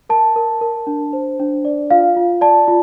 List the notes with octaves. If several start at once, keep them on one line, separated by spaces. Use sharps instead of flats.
A#4 A5
A#4
A#4
D4
C5
D4
D5
F4 F5
F4
D5 A5
F4